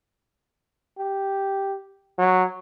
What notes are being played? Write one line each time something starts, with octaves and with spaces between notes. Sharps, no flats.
G4
F#3